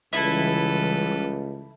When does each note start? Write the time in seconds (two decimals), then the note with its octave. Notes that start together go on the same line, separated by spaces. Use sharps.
0.13 C#2 C#3 E3 G3 E4 A4 B4